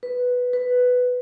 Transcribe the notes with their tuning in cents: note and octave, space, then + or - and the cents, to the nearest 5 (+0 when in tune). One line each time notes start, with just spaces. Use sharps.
B4 +0
B4 +5